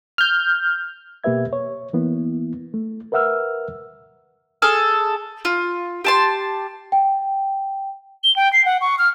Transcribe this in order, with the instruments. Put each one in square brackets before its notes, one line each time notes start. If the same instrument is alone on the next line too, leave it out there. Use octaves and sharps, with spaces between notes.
[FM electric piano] F6 G6
[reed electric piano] B2 A#3 G4 B4 E5 G#6
C#5
E3 A#3 B3 E4
A3
A#4 B4 E5 F#5 E6 F6
[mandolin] G#4 A4 F6
F4
G4 A5 C6
[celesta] G5
[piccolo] G7
G5
C7
F#5
C#6
F6